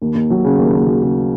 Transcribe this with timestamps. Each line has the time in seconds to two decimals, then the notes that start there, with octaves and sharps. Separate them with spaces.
0.02 D#2
0.15 D#2
0.30 F#3
0.44 C#3
0.58 D#2
0.73 D#2
0.87 F#3
1.02 C#3